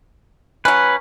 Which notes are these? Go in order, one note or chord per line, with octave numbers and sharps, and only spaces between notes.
F#3 C#4 B4